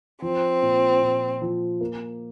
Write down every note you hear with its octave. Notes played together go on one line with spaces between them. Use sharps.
F3 C4
A#2
A#2
F3
A#3